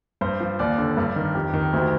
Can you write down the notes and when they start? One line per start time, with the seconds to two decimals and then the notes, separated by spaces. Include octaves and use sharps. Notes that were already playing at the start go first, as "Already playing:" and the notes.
0.21 G2 C5
0.40 F3
0.59 D#2 D5
0.78 D3
0.97 G2
1.16 D#3
1.35 F2 G4
1.54 D#3
1.73 D2